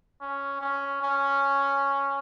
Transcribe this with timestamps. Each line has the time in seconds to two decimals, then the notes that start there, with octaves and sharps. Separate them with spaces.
0.21 C#4
0.61 C#4
1.02 C#4